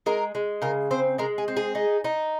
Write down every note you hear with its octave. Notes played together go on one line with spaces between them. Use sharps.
G#3 A#4
G#3
C#3 A#4
C4 C5
G#3 A#4
G#4
C4
G#4
D#4
D#4